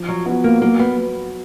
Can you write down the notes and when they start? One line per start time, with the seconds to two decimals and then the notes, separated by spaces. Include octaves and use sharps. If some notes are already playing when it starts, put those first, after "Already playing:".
Already playing: F3
0.08 F#3
0.26 B3 F#4
0.44 A#3
0.62 F#3 A#3
0.79 B3